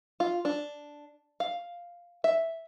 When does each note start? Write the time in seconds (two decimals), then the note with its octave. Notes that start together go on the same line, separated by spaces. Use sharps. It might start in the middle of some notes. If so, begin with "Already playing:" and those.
0.20 F4
0.45 D4
1.40 F5
2.24 E5